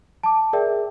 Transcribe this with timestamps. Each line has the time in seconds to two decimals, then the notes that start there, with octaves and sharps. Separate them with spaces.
0.23 A5 D6
0.53 G#4 A#4 D5 E5 G5